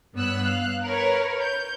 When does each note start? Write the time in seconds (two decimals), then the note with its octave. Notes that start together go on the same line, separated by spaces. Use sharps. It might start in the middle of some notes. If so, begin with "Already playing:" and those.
0.15 G2 B3 C#5 E6 F#6
0.43 F5 F#6
0.83 A#4 B4 C#5
1.41 G6